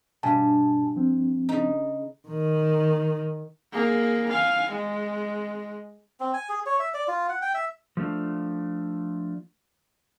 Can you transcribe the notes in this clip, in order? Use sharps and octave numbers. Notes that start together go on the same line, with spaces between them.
G2 B2 G#5 A5
F3 C4
C#3 D#4
D#3
A#3 G#4
F5 G#5
G#3
C4
G#5
G#4
C#5
E5
D5
F4
F#5
G5
E5
F3 A3 D4 F4